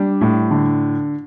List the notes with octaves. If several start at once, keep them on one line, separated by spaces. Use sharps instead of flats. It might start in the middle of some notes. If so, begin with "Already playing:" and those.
Already playing: G3 D4
A2
D3